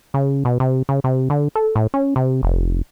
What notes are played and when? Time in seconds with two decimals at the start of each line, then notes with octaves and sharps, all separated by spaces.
0.14 C#3
0.45 B2
0.60 C3
0.89 C#3
1.04 C3
1.30 D3
1.55 A4
1.76 A2
1.94 C#4
2.16 C3
2.43 F1